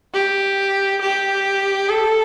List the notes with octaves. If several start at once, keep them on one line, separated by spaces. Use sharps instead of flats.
G4
G4
A4